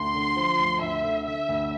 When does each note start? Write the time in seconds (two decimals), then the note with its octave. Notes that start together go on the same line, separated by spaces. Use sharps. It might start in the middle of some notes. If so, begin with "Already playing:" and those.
Already playing: D2 C6
0.14 D3
0.36 F3
0.59 D2
0.81 D2 E5
1.04 D3
1.26 D3 E5
1.49 D2